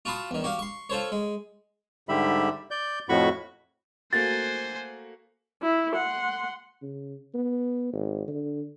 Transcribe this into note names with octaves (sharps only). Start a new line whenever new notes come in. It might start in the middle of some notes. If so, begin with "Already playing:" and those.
F4 F#4 A5 B5 C6 D#6
E2 D#3
F#4 G4 F5
C6 C#6
F4 A4 C5 C#5
G#3
G#2 D3 G3 G4 E5 B5
D5 G6
F2 A2 F#4 B5 C#6
A3 A#3 F#4 C5 G#5 A6
E4
F#5 C6
C#3
B3
G#1
D3